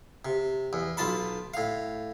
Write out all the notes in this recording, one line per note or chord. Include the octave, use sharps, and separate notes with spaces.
C3
E2
B1 F4 A5 B5
A2 F5